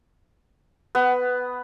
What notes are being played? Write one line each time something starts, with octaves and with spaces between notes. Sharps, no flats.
B3